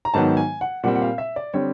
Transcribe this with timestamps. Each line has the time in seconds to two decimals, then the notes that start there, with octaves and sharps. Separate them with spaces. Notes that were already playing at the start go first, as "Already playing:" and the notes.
0.05 A#5
0.14 G#2 D#3 F#3 B3 A5
0.37 G#5
0.61 F#5
0.83 A#2 G3 C4 F#5
0.95 F#5
1.02 F5
1.18 E5
1.36 D5
1.54 D3 G3 C4 C#5